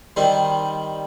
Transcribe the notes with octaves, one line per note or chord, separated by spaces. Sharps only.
D#3 G3 C4